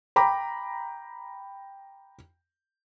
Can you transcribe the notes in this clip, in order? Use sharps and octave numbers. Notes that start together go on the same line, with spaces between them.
G5 A#5 B5 D6